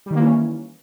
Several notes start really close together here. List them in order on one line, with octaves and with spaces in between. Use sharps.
G3 D#3 A#3 E3 C#4